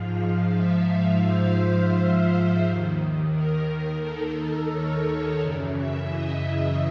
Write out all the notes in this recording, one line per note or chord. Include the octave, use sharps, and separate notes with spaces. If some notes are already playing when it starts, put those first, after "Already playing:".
Already playing: G#2 F3 F5
E5
C5
D#2 D#3
A#4
A4
C#5
F#2 C#3 E3 D5
E5
D#5